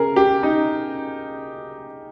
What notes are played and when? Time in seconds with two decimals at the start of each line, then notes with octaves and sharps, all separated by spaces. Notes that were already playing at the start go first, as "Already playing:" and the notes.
Already playing: C#4 G#4 A#4
0.16 G4
0.43 D#4